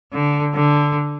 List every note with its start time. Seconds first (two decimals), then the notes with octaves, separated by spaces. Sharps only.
0.13 D3
0.55 D3